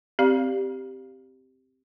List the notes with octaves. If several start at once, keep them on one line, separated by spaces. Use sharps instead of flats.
C4 G4 D5 F5